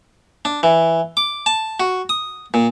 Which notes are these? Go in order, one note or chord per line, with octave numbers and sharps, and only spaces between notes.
D4
E3
D6
A5
F#4
D#6
A#2